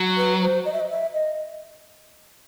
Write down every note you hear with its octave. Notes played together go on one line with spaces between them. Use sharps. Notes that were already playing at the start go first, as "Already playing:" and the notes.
Already playing: F#3
B4
C5
D#5
E5
D#5
E5
D#5